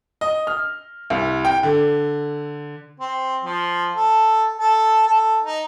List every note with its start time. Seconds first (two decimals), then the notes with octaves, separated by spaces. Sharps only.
0.21 D#5
0.47 F6
1.10 C2
1.45 G5
1.63 D3
3.00 C4
3.43 F3
3.95 A4
4.58 A4
5.07 A4
5.43 D#4